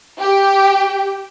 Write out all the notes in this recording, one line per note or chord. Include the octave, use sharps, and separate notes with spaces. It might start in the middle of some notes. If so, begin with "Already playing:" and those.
G4 G5